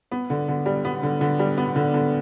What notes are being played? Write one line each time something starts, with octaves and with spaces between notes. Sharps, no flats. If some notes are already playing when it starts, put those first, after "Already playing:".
B3
D3
D3
G3
B3
D3
D3
G3
B3
D3
D3